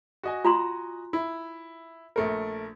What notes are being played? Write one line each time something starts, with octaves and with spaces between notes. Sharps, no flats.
F#4 D#5 G#5
F4 A#5 C6
E4
A#1 A3 A#4